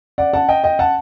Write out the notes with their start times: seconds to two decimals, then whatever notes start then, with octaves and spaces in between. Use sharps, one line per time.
0.18 D5 F#5
0.33 F#5 A5
0.49 D#5 G5
0.64 D#5 G5
0.79 F#5 A5